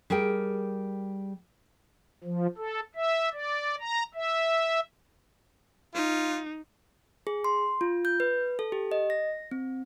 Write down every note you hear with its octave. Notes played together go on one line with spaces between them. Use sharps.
G3 G#4 A#4 G5
F3
A4
E5
D5
A#5
E5
D#4 F4
G#4
C6
F4
G6
B4
A4
G4
D#5
A#6
C4